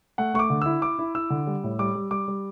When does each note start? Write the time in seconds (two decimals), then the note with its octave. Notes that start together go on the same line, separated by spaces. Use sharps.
0.18 A3 F#5
0.34 A3 C#6
0.39 D6
0.50 D3
0.62 E4 E6
0.82 E4 D6
0.99 E4
1.15 E4 E6
1.30 D3
1.47 G3
1.64 A2
1.79 G3 D6
1.95 G3
2.11 G3 D6
2.28 G3